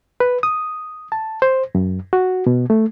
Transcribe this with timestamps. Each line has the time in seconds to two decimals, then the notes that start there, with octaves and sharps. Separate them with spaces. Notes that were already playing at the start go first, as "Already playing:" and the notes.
0.20 B4
0.43 D#6
1.12 A5
1.42 C5
1.75 F#2
2.13 F#4
2.46 B2
2.70 A3